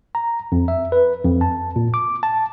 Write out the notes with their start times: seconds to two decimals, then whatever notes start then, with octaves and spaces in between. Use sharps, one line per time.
0.15 A#5
0.52 F2
0.68 E5
0.92 B4
1.24 F2
1.41 A5
1.76 A#2
1.94 D6
2.23 A5